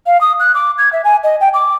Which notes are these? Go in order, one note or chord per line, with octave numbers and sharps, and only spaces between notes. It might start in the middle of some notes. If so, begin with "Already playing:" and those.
F5
D#6
F#6
D6
G#6
E5
G#5
D#5
G5
D6